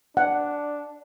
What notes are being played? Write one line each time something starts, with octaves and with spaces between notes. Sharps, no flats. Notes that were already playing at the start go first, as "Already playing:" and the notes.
D4 F#5